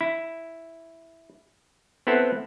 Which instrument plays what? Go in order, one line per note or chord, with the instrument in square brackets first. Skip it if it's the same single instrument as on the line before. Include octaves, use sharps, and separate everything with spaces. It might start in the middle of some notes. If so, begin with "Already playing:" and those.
[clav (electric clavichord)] E4
B3 C4 E4 A4 F#5